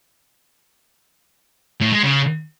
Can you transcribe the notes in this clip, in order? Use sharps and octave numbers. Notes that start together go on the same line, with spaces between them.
A2
G#3
C#3